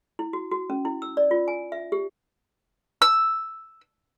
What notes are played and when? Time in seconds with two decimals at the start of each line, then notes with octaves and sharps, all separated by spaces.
0.19 E4
0.33 F#4
0.51 F#4
0.70 C#4
0.85 E4
1.02 E6
1.17 D5
1.31 F4
1.48 G#5
1.72 E5
1.92 G4
3.02 E6